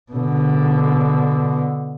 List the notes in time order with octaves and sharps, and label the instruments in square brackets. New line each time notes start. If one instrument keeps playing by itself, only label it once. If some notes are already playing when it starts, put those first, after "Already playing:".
[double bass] B2 D3